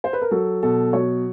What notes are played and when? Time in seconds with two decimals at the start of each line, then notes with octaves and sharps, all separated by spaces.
0.04 C5
0.13 B4
0.22 A#4
0.31 F#3 A4
0.63 B2 A4
0.93 F#3 C#5